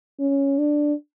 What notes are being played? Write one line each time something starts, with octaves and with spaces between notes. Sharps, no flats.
C#4
D4